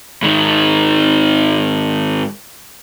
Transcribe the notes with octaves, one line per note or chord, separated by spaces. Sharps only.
G#2 D#3